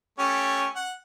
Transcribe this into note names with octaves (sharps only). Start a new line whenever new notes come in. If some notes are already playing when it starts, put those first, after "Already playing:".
A3 C#4 G4 C#5
F#5